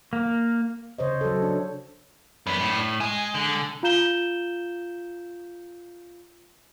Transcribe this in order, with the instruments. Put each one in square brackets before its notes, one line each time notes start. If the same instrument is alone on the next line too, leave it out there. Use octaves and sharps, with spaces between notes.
[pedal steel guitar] A#3
[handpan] C#3 C5 C#5 D#5
F#3 A4
D4
[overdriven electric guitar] F#2 B3 [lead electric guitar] D4 B4
[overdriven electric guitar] A2
[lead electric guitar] G#3 [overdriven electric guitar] G#5
[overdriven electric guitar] D3
[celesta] F4 F5 A#5 G6 E7 G7